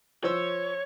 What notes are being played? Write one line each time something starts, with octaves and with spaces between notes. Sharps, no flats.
F3 C5 C#5 E6